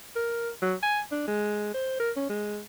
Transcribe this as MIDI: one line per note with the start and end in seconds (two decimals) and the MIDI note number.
0.16 0.49 70
0.62 0.75 54
0.83 1.00 80
1.11 1.24 62
1.28 1.73 56
1.74 1.95 72
2.00 2.11 70
2.16 2.25 61
2.29 2.60 56